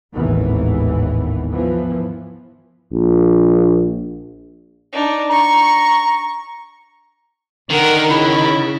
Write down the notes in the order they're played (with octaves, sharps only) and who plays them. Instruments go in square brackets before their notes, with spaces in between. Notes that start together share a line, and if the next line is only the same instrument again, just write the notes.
[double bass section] G#1 D#2 A2 E3 B3
E3 F3 B3
[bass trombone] A#1
[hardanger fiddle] D4 D#4
[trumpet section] A#5 [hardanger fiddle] C#6
[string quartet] D3 A#4 F#5 [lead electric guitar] D#3
[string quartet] C#3 [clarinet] E4